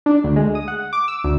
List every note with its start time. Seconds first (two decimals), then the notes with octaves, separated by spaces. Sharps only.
0.06 D4
0.24 D2
0.36 G#3
0.55 D#6
0.68 F#5
0.93 D6
1.08 E6
1.24 D2